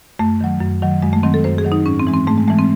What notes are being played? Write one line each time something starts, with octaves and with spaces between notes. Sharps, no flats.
F#2 A3
D#3 F#3
F#2
D#3 F#3
F#2 G#3
A3
D#3 F#3 C4
A4
F#2 C5
G#4
D#3 F#3
D#4
G#2 C#4
C4
E3 G#3
C4
G#2 A3
G#3
E3 G#3 A3
C4